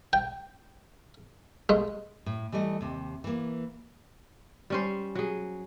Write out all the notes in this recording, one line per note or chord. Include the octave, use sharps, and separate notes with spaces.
G5
G#3
A2
E3 G3 A3 D#5
D#2 C3
E3 A#3
G3 C#4 C5
F#3 G#4